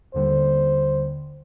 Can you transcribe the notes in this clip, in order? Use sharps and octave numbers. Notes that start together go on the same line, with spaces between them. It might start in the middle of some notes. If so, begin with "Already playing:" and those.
D#2 D3 G3 C5